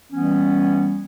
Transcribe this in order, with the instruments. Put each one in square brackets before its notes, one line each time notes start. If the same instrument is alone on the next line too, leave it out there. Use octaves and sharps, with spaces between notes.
[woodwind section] E3 G3 B3 C#4